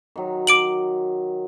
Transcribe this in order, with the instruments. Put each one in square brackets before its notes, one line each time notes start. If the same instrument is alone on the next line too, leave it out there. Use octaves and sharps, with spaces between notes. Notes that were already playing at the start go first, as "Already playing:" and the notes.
[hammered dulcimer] D#3 F#3
[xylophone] D6 D7 F#7